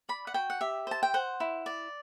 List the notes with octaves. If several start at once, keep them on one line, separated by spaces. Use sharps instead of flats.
D5 B5
F#5
F#4 G5
F#5
G4 E5
C5 A5
G5
C5 F#5
E4
D5